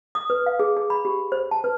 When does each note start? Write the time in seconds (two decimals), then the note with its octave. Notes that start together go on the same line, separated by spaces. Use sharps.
0.15 D#6
0.30 B4
0.46 F5
0.59 G#4
0.77 G#4
0.90 B5
1.05 G4
1.32 C5
1.51 A5
1.64 B4